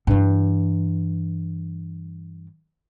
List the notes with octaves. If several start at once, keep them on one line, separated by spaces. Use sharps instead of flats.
G2 E3